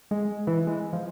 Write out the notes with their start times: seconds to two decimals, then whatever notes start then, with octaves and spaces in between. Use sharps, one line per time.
0.11 G#3
0.47 E3
0.67 G#3
0.93 F3